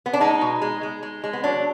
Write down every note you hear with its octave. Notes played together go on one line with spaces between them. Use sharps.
B3
D4
G#3 D#4
B2
G#3
G#3
G#3
G#3
B3
F#3 D4